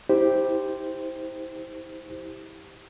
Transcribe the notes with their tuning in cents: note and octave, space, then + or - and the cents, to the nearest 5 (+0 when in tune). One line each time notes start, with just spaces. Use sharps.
E4 -30 G4 +5 C5 -5